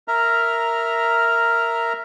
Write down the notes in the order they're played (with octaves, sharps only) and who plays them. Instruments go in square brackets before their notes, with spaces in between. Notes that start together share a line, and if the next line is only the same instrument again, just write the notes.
[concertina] A#4 E5 A#5 F6